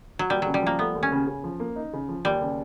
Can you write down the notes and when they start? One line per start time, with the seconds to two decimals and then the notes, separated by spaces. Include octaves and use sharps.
0.19 F#3
0.30 D#2 G3
0.42 C#3 F#3
0.54 G3
0.62 F3 A#3
0.79 A3 B3
0.95 D#2
1.03 C#4
1.12 C#3
1.27 C#3
1.43 F3
1.60 A#3
1.76 D#4
1.93 C#3
2.08 F3
2.25 D#2 G3
2.41 C#3